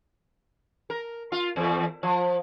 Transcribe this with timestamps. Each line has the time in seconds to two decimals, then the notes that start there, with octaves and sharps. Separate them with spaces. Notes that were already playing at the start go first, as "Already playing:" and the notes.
0.90 A#4
1.32 F4
1.56 E2
2.03 F3